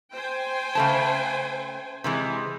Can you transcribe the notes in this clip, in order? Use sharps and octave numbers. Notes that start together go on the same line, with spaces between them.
C5 G5 G#5
C#3 A3 A5
C3 E3 G#3